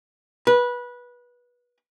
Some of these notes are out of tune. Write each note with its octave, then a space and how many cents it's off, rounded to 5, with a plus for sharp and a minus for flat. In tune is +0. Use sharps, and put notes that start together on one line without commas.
B4 -20